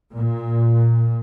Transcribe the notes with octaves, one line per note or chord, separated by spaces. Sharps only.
A#2